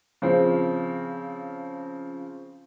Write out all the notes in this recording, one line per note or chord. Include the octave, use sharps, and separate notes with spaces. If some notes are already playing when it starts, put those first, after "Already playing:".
C#3 F3 C4